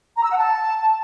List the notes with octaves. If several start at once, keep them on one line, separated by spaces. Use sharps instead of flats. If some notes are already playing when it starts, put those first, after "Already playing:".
A#5
E6
F#5
A5